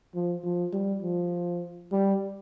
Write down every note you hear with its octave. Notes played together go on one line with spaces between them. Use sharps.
F3
F3
G3
F3
G3